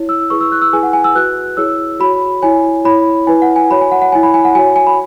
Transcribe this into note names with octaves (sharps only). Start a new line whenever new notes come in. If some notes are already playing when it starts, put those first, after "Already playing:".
Already playing: E4 C#5
E6
E4 G#4 B4 C#6
E6
F#6
E6
E4 G#4 B4 G#5
F#5
G#5
E6
F#4 B4 F#6
E4 G#4 C#5 E6
F#4 C#5 B5
E4 C#5 G#5
E4 C#5 B5
E4 B4 G#5
F#5
G#5
F#4 C#5 B5
G#5
F#5
F#5
E4 C#5 G#5
B5
G#5
F#5
F#4 C#5 G#5
G#5
B5